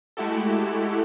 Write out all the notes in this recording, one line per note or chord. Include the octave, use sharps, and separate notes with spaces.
G#3 A3 E4 F#4 G4 A4